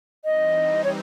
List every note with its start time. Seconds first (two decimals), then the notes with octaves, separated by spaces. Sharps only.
0.25 E3 G3 C4 D#4 D#5
0.84 C#5